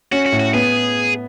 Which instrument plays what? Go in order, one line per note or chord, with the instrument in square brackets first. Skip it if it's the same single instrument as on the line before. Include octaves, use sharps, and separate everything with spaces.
[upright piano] C#4 [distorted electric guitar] F#4
[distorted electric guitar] F#4
[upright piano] A2
[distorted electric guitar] F#4
[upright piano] B3 [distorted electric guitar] G#4